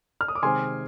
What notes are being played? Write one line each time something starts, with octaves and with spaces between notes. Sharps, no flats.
F6
D#6
D6
C3 D#3 G#3 C4 G#5 C6